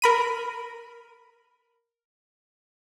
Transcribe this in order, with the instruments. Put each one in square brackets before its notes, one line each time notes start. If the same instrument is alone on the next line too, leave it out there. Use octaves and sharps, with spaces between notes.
[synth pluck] A#4 B5 D#7